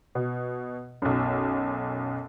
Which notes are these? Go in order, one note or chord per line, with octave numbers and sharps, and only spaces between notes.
B2
B1 F#2